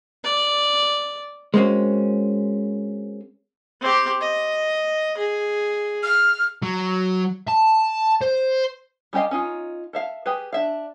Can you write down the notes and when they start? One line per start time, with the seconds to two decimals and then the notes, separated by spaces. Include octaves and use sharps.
0.23 D5
1.54 G#3 A#3 C4 C#4 F#4
3.80 C4 G4
4.21 D#5
5.17 G#4
6.03 F6
6.63 F#3
7.48 A5
8.21 C5
9.13 G3 C#4 G4 D#5 F5
9.31 C#4 D#4 F4
9.93 A4 E5 F5
10.26 G4 G#4 B4
10.53 D4 E5 F5